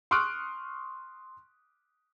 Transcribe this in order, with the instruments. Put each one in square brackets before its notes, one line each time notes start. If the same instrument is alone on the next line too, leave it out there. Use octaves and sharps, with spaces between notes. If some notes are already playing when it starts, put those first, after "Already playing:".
[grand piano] C6 C#6 D#6 F6 F#6 D7